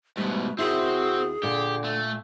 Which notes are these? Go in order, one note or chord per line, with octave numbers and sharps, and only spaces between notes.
G#2 B2 G3 A3
D#2 C4 E4 F#4 G#4
A#2 D3 G4
A3